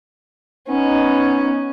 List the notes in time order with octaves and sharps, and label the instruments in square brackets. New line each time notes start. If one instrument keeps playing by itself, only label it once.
[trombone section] B3 D#4 [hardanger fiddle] C#4